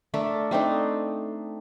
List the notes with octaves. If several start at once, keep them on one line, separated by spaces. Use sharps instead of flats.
A3 D4 A4 A#4
A3 C4 D4 D#4